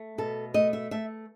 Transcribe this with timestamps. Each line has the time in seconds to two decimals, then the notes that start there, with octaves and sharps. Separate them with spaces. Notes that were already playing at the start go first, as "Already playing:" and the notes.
Already playing: A3
0.18 B2 A4
0.54 A3 D#5
0.73 E5
0.91 A3 E5